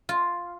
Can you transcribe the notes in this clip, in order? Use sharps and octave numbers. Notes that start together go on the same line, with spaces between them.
F4